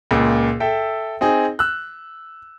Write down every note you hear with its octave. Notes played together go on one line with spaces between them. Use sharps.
C#2 A#2
A4 E5 G5
C4 D#4 G#4
E6 F#6